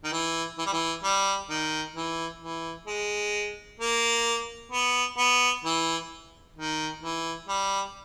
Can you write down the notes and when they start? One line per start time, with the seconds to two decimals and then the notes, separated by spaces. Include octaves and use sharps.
0.04 D#3
0.12 E3
0.58 E3
0.66 G3
0.73 E3
1.04 G3
1.49 D#3
1.96 E3
2.42 E3
2.87 G#3
3.80 A#3
4.71 B3
5.17 B3
5.64 E3
6.56 D#3
7.02 E3
7.48 G3